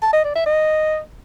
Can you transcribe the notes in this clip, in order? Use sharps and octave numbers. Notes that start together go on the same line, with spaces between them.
A5
D#5
D5
E5
D#5